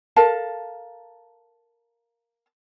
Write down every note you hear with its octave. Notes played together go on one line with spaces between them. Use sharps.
A4 A#4 F5 A5